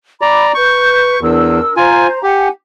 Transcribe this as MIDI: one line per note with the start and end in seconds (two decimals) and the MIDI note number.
0.21 0.52 74
0.21 0.52 82
0.21 0.45 83
0.21 0.45 86
0.54 1.20 71
0.54 1.19 85
0.54 1.20 91
1.21 1.60 40
1.21 1.76 62
1.21 1.76 70
1.21 1.76 88
1.77 2.07 65
1.77 2.22 72
1.77 2.07 80
1.77 2.22 82
2.23 2.48 67
2.23 2.49 78
2.23 2.49 80